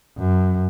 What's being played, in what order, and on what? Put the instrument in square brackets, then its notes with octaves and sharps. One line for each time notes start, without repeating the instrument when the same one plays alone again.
[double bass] F#2